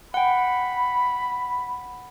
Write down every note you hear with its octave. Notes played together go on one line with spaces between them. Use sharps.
F#5 G5 B5